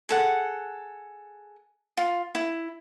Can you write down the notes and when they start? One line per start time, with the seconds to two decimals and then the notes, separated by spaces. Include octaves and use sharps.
0.09 G#4 A4 F#5
1.97 F4
2.35 E4